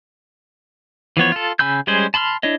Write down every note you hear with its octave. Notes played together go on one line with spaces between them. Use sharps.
E3 F3 B3 C#5
F4 A4
C#3 G#5 B5 E6 G6
G3 G#3 C#4 G#4 C5
A5 B5 C6 E6 F6
D4 E4 C#5 D#5